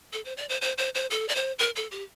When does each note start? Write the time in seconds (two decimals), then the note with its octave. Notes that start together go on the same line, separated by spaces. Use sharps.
0.13 A4
0.25 C5
0.37 D5
0.49 C5
0.62 C5
0.78 C5
0.95 C5
1.11 A4
1.29 D5
1.36 C5
1.59 A#4
1.76 A4
1.91 G4